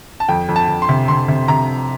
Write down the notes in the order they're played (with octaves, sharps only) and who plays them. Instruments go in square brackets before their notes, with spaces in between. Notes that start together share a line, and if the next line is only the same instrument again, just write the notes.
[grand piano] A5
F2 G5
F2
A5
F2
C6
C3
C3 C6
C3
C3 A#5